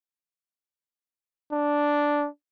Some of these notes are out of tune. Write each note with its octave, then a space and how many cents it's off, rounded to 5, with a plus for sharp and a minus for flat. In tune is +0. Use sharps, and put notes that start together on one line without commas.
D4 -5